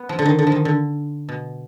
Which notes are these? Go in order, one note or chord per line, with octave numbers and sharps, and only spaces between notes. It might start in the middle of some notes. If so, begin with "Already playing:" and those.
Already playing: B3
F3
D3
D#3
D3
F3
D#3
D3
B2